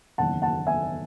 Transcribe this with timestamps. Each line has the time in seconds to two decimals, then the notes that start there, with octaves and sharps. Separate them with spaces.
0.18 F#1 E2 D#3 F#5 A5
0.42 F#5 A5
0.67 E5 G#5